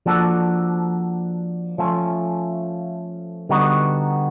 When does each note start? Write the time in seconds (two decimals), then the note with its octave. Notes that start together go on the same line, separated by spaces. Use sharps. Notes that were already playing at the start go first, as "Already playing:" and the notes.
0.06 F3 A#3 D4 F#4 A4
1.78 F3 A3 C#4
3.49 D3 G3 B3 D#4 F#4